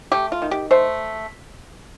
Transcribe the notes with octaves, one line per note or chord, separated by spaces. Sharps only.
A3 G4
F4
D#3
G4
A3 C5